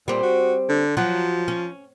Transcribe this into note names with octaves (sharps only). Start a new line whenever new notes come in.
A#2 G3 C4
F#4
D3
F3 F#3
C#4